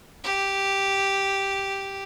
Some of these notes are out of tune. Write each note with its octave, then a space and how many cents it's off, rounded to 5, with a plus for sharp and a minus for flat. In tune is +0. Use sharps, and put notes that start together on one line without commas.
G4 +0